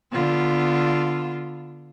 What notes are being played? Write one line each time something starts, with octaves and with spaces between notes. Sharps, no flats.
D3 B3 F4